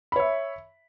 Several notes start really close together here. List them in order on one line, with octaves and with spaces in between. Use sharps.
B5 C#5 E5